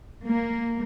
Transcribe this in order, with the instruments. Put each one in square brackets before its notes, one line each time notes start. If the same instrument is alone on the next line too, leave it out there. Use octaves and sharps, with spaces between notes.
[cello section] A#3